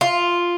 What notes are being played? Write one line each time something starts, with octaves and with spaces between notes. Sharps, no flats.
F4